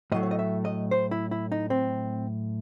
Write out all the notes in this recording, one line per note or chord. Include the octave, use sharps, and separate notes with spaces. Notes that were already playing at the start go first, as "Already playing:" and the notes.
A2 F#3 A3 D#5
C#5
D#5
E5
D#5
C5
E4
E4
D#4
C4